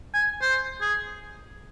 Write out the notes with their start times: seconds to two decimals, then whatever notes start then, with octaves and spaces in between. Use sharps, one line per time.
0.14 G#5
0.42 C5
0.81 G#4